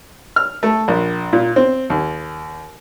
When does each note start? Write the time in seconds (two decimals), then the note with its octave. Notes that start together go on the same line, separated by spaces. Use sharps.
0.36 F6
0.63 A3
0.88 A#1
1.33 A#2
1.56 C4
1.90 D#2